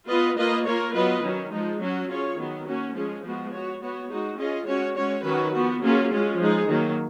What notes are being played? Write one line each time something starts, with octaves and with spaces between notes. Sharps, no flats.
B3 F4 B4 D#5
A#3 F4 B4 D#5
A#3 F4 A#4 C#5
F#3 B3 F4 B4 D#5
D#3 F#3 C#4
F3 G#3 D#4
F#3 C#4 F#4
C#4 F4 G#4 C#5
D#3 F#3 B3
A#3 C#4 F#4
F3 G#3 C#4 G#4
F3 G#3 B3 F#4
B3 F#4 C#5
B3 F#4 C#5
G#3 D#4 F#4
C#4 F4 G#4 D#5
G#3 C#4 F#4 C#5
G#3 C#4 F#4 C#5
D#3 F#3 C#4 F#4 B4
F3 B3 F#4
F#3 A#3 C#4 F4 G#4
G#3 C#4 F4
F3 G#3 D#4 G#4
D#3 F#3 A#3